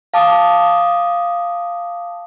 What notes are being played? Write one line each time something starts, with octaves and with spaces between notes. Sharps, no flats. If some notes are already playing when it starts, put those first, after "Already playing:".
F5 A5 D6 D#6